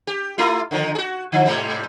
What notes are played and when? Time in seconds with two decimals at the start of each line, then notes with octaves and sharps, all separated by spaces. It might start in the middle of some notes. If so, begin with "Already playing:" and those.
0.07 G4
0.38 A3 E4 F4
0.71 D3 D#3 F3
0.95 F#4 G#4
1.32 D3 F3
1.46 G#2 C3 G3